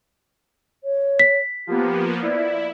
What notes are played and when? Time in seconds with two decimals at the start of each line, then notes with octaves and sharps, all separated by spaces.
0.83 C#5
1.19 B6
1.67 F3 A#3 B3 G4
2.22 E4 D5